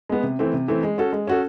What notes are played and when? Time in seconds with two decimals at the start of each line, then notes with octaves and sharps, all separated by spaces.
0.09 G#3 B3
0.23 C3
0.39 E3 A3 C4
0.53 C3
0.68 E3 A3 C4
0.83 G#3
0.98 C#4 F#4 A4
1.12 G#3
1.27 C#4 F#4 A4